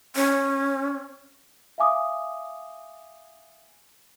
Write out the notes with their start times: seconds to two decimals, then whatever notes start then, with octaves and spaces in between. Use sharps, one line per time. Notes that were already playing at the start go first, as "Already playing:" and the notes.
0.16 C#4
1.78 E5 F5 G#5 D6 D#6